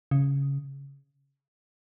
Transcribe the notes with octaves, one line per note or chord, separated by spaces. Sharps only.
C#3